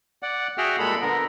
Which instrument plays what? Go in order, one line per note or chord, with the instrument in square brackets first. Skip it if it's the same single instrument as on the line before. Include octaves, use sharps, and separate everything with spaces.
[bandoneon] D5 F#5
F#4 G#4 E5 F#5 G5 F6
A#2 G3 G#3 A4 B5
D3 B3 A#4